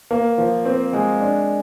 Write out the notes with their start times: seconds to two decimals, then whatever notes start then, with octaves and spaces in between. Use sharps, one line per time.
0.11 A#3
0.38 F3
0.65 C4
0.93 G#3
1.20 D4